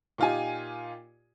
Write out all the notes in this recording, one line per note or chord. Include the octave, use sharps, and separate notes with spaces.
A#2 D#4 F4 G4 G#5